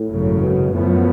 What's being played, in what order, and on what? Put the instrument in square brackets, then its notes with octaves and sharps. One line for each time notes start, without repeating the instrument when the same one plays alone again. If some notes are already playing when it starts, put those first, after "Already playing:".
Already playing: [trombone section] A2
[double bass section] G#1 F#2 C#3
[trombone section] B2
[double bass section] F#2 F3 B3 [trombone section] A2